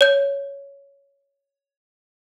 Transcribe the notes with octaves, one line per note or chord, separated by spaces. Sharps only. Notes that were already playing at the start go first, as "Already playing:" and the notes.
C#5 G6